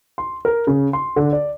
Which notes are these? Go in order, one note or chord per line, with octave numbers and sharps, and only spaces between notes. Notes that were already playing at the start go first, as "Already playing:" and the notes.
C6
A#4
C#3
C6
D3
D5